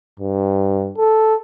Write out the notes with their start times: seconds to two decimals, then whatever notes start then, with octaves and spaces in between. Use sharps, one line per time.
0.20 G2
0.98 A4